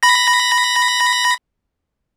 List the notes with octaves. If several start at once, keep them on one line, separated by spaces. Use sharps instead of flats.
B5 A#6